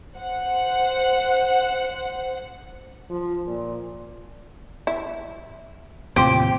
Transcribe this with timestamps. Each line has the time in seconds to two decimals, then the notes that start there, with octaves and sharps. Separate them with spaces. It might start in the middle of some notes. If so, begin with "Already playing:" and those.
0.16 C5 F#5
3.10 F3
3.46 A#2
4.87 E4
6.16 D#2 A2 C3 F3 C4 G4